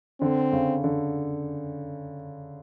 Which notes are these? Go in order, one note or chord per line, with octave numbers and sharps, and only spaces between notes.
D3 C4
C#3
D3